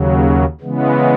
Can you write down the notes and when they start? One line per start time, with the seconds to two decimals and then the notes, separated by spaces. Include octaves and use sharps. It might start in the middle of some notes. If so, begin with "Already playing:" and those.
Already playing: D#2 C#3 F#3
0.61 C#3 E3 G#3 B3